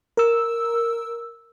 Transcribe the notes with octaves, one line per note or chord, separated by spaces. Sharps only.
A#4 E6